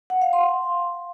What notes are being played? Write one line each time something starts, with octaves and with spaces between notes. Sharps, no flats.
F#5
F5
C6